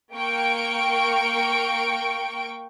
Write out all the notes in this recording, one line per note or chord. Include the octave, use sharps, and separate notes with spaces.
A#3 G5 C#6 D7